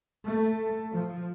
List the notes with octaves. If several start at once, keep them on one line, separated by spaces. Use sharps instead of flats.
A3
F3